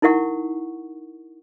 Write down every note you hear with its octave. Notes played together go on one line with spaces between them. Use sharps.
D#4 E4 A#4 F#5 C#6